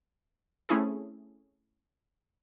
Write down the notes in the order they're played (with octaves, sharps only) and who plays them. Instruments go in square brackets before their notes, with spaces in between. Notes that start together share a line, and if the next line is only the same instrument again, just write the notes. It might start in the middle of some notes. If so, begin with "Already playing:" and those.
[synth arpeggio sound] A3 C4 C#4 E4 G#4 A4